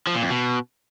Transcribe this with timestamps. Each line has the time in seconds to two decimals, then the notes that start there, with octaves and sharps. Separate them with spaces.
0.07 F3
0.15 A#2
0.23 F2
0.30 B2